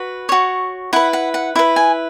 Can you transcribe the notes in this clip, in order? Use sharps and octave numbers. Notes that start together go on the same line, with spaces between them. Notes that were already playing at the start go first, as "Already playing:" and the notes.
Already playing: F#4 B4
F#4 C#5
E4 B4 F#5
F#5
F#5
E4 B4
G#5